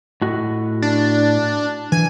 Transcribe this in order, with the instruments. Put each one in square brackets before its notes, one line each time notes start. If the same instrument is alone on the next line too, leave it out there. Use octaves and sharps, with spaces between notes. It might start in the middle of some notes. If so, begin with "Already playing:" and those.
[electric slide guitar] A2 F#4 D#5
[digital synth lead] D4
[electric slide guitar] E3 [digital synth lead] G#5